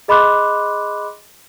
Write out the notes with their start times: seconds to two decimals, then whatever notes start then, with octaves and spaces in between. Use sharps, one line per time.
0.08 G#4 D#5 B5 C6 D6 F#6